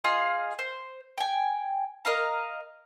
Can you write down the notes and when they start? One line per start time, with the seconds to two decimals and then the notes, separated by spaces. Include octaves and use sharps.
0.04 F4 G#4 D#5 F5
0.59 C5
1.18 G5 G#5
2.05 A#4 D#5 F5 A#5